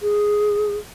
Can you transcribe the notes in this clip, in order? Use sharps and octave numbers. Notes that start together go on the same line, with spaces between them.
G#4